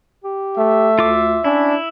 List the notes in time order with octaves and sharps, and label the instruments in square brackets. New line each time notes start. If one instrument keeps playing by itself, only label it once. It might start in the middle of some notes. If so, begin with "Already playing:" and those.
[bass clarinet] G4
[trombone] A3 [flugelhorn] E5
[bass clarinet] D2 [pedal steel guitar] F4 D6
[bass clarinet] C#4 [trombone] D4 [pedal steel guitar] E4